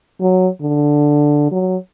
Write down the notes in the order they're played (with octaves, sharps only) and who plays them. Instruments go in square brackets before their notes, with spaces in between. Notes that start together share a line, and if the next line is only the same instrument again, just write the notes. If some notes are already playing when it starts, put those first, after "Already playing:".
[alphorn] F#3
D3
F#3